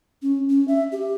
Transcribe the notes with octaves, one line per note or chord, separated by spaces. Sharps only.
C#4
C#4
E5
G4